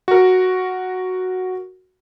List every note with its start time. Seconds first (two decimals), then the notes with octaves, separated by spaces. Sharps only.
0.08 F#4 A#4